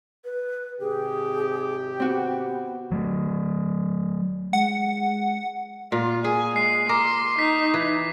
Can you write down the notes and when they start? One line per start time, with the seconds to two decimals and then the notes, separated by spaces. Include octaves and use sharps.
0.25 B4
0.81 G#1 C3 G4 G#4
2.00 B3 C4 F#4
2.92 F#3 A3
4.53 G#3 F#5
5.92 A#2 F4
6.24 G#4 G#5
6.56 G#3 C7 D#7
6.89 A#4 C6 D6
7.39 D#4 B6
7.74 E3